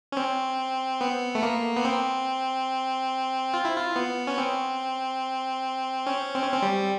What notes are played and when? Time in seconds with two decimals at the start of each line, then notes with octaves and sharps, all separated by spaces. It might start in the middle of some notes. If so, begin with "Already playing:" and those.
0.12 C#4
0.17 C4
1.01 B3
1.35 A3
1.43 A#3
1.77 B3
1.85 C4
3.54 F4
3.65 E4
3.76 F4
3.96 B3
4.27 C#4
4.38 C4
6.07 C#4
6.35 C4
6.43 C#4
6.52 C4
6.62 G3